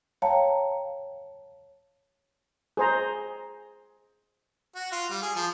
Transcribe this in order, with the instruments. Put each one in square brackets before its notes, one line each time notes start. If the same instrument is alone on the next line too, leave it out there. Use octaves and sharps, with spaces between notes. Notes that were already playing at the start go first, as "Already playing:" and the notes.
[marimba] C#5 F5 G5 A5 A#5
[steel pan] G#4 C5 A#5
[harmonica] F#4
F4
G3
G#4
F3